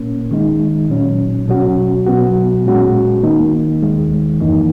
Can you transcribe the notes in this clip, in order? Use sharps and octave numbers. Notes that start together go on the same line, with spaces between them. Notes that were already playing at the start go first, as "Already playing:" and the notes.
Already playing: A#2 A#3 C#4
D#3 G#3 D#4
A#2 F#3 C#4
B2 F#3 C#4 F#4
B2 F#3 B3 F#4
A#2 G#3 C#4 F#4
D#3 A#3 D#4
D#2 D#3 G#3
F#2 E3 A#3 D#4